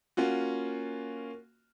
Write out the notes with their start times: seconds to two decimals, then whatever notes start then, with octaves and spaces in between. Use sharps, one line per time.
0.17 A#3 C#4 F4 F#4